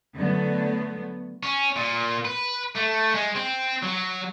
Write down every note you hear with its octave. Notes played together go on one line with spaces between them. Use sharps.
D3 F#3 A3 B3
C#4
A#2
B4
A3
G#3
C4
F#3